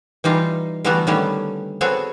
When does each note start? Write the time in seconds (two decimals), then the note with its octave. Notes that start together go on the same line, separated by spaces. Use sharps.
0.24 E3 G3 D#4 F4
0.84 D3 E3 G3 A3 B3 F#4
1.07 D3 D#3 G3 A3 B3 C#4
1.81 B3 C4 F#4 G#4 A4 C#5